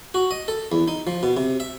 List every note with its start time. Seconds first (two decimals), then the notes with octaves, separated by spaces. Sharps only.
0.14 F#4
0.31 D#5
0.48 A4
0.72 E2
0.88 D#4
1.07 F3
1.23 B2
1.37 C3
1.60 E5